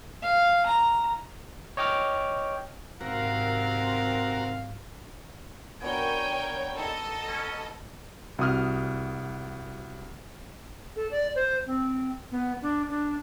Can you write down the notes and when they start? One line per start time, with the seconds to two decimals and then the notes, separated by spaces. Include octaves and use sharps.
0.22 F5
0.66 A#5
1.77 C#5 D#5 G5 D6 F6
3.00 G#2 C3 D#3 C4 F#4 A#4 F5
5.82 B3 D4 F#4 A#4 C#5 G5 G#5
6.79 D#4 A4 D#5 D#6
7.28 C#4
8.39 C2 F#4 D#6 F6
10.96 A4
11.11 D5
11.35 C5
11.66 C4
12.32 B3
12.62 D4
12.89 D4